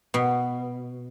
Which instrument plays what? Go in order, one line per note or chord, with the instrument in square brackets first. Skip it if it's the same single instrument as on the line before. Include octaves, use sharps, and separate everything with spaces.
[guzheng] B2